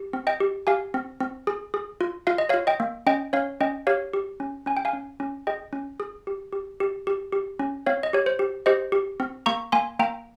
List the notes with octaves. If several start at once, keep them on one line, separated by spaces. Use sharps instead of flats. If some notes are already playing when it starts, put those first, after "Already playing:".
Already playing: G4
C4
D#5 G5
G4
G4 F5 G#5
C4
C4
G#4
G#4
F4
F4 F5
D#5
C#5 F5
F4
D#5 G5
A#3
C#4 D#5 G5
C#4 C#5 F5
C#4 D#5 G5
G4 C#5 F5
G4
C#4
C#4 G#5
G5
F5 G#5
C#4
C#4
G#4 D#5 G5
C#4
G#4
G4
G4
G4
G4
G4
C#4
C4 C#5 F5
D#5
G4 C#5
C5
G4
G4 C5 D#5
G4
C4
A#3 A#5 C#6
A#3 G#5 C6
A#3 G5 A#5